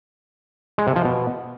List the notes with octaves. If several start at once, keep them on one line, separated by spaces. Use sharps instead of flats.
G#3
C3
F3
B2